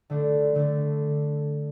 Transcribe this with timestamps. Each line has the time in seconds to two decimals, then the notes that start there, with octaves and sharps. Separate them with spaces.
0.10 D3 A3 D4
0.55 D3 A3 D4